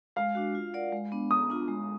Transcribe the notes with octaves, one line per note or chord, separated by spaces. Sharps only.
G#3 F5
D4 F#4
F4
A#4 D5 F#5
G#3
B3 D4
B3 D#6
D4 F4
G#3